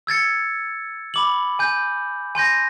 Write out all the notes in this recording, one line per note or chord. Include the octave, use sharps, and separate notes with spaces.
E6 G#6 A6 C#7
B5 D6 F#7
G#5 G6
G#5 C6 G6 A#6